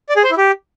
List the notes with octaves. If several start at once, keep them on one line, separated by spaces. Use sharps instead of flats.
D5
G#4
C5
E4
G4